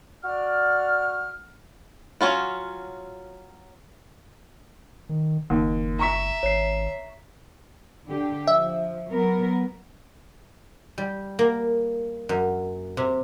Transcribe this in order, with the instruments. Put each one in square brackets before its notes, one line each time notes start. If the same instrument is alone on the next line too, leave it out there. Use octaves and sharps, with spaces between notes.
[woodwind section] F#4 D5 F6
[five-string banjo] F#3 C#4 F4 F#4
[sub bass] D#3
[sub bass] F#1 [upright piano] D#2
[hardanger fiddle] E5 [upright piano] A#5 C#6 B6
[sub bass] G#1 [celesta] C#5 C7
[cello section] D3 G4
[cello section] F3 [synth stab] E5
[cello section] F#3 B3 A#4
[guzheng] G3
A#3
F#2
C3